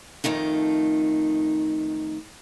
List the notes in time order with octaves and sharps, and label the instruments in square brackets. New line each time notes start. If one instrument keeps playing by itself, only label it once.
[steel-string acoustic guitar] F2 D#3 A3 D#4